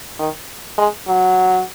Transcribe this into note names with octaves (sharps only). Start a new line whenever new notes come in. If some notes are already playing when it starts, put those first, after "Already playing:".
D#3
G#3
F#3